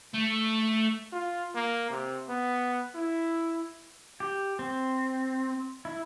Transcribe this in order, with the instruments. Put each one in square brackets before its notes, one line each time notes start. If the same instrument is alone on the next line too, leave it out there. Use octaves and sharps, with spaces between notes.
[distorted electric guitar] A3
[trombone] F4
A#3
C3
B3
E4
[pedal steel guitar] G4
C4
E4